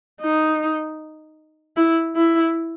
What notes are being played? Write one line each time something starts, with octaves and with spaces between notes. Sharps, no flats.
D#4
E4
E4